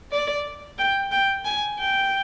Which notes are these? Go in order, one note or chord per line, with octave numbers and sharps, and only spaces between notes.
D5
G5
G5
G#5
G5